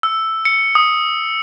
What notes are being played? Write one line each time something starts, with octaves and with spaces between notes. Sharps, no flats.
E6
C#7
D#6